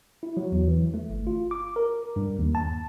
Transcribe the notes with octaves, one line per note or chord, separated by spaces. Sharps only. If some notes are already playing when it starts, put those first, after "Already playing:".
E4
F#3
E2
E3
A3
G1
F4
D6
A#4
G2
D#2
A5